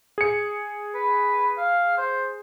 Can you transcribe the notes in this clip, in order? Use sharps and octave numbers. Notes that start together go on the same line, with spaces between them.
G#4 C#7
B4
F5
C5